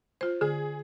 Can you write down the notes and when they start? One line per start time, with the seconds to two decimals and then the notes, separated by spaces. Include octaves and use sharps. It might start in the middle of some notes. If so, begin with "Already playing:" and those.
0.21 F4 C5
0.41 D3 G#4